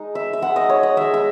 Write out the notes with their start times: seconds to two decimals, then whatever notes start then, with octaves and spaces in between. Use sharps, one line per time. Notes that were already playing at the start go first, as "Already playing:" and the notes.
Already playing: G#3 D#4
0.15 E5
0.33 E5
0.42 G#3 D#4 F#5
0.56 D#5
0.70 C#5
0.83 D#5
0.96 G#3 D#4 E5
1.14 E5